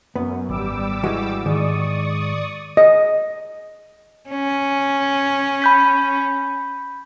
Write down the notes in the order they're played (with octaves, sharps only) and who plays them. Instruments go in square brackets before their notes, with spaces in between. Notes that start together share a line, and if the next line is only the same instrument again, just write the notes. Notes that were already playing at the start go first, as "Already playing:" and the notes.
[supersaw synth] F#2 [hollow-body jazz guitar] B3
[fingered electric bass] G#1 [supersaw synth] G3 D6 E6
[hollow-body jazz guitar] E3 G#3 F#4
[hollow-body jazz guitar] G#2 [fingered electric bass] D#3 [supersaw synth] D5 C#6 D#6
[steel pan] D#5
[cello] C#4
[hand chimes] B5 G6 B6